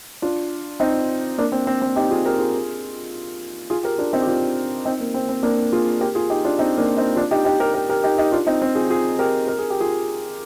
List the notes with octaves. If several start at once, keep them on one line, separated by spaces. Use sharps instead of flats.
D4 F4
C4 D#4
A#3 D4
C4
C4
C4
D#4 G4
F4 G#4
G4 A#4
F4 G#4
F4 G#4
G4 A#4
D4 F4
C4 D#4
G4
D4 F4
C4 D#4
A#3
C4
C4
A#3 D4
F4 G#4
G4 A#4
F4 G#4
D#4 G4
D4 F4
C4 D#4
A#3 D4
C4 D#4
D4 F4
D#4 G4
D#4 G4
G4 A#4
G4 A#4
G4 A#4
D#4 G4
D#4 G4
D4 F4
C4 D#4
C4
F4 G#4
F4 G#4
G4 A#4
A#4
G#4
G4
F4 G#4